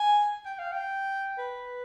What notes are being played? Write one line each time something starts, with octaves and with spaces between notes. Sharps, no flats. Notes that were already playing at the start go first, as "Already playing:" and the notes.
Already playing: G#5
G5
F5
G5
B4